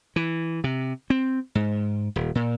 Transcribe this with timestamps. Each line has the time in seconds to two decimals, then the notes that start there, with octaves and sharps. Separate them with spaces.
0.16 E3
0.64 C3
1.10 C4
1.55 G#2
2.16 D#1
2.35 A#2